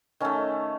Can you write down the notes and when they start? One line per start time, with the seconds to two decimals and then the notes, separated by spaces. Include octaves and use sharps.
0.20 D#3 A3 C#4